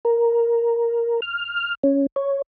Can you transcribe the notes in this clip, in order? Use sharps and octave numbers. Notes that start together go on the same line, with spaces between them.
A#4
F6
C#4
C#5